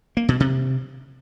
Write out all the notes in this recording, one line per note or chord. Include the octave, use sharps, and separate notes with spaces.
A#3
B2
C3